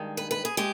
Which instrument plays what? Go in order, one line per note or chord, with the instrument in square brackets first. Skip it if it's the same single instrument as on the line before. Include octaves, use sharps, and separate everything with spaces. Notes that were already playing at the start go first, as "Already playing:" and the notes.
Already playing: [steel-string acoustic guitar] G2 D#3 G#3
B4
B4
G#4
G#3 G4